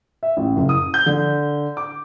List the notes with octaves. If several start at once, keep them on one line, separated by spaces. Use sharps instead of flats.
E5
A1
F#1
D#6
G6
D3
D6